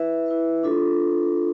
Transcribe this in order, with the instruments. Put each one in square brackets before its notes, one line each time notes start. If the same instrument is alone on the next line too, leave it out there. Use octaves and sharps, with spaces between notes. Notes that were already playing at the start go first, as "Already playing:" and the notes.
Already playing: [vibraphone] E4 B4 E5
E4 B4 E5
D4 F4 A4